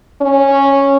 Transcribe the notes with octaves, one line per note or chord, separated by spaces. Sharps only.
C#4